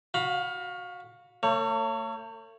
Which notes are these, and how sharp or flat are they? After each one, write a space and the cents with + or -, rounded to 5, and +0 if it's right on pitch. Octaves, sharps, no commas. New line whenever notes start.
F#4 -5 F5 +25 B5 +0
A3 +45 C#5 +0